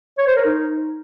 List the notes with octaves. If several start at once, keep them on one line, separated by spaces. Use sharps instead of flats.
C#5
C5
A#4
D#4